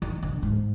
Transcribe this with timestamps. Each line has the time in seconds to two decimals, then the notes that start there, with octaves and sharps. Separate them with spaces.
0.02 D#3
0.22 D3
0.42 G#2